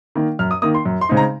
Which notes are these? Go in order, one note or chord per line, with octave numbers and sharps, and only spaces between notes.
D#3 A#3
F#2 F6
D#6
D#3 A#3 D#6
C6
F#2
C6
C#3 G#3 C4 D#4
A#5